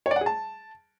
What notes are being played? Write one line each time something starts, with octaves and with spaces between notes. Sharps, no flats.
C#5
D5
F#5
G#4
A5